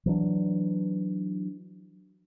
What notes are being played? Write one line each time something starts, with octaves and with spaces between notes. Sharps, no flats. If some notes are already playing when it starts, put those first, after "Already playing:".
E3 F#3 D4